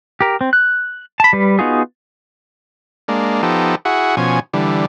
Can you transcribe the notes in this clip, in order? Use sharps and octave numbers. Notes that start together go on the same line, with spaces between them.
G4 A#4
C4
F#6
A5 B5
G3 B4
B3 D#4 F4 F#4 G#4
G#3 A#3 D4
F3 B3 D#4 G4 A4
E4 F#4 G#4 F#5
B2 F3 C#4 G#5
D3 E3 G3